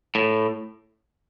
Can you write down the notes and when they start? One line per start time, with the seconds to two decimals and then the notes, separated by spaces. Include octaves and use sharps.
0.15 A2